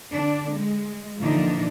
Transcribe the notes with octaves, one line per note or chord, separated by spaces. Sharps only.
D3 D4
G#3
A#2 D3 E3 F3 D4 D#4